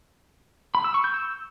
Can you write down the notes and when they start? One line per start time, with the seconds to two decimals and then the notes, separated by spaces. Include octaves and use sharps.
0.75 B5
0.84 E6
0.94 C#6
1.04 G6
1.14 E6